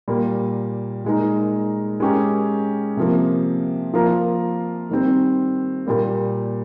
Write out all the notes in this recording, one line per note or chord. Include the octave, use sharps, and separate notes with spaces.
A#2 G3 A#3
A#2 G#3 D#4 A#4
G#3 C#4 G4 A#4
C3 F3 A#3
F3 A#3 F4 A#4
D#3 G3 C4
A#2 G3 A#3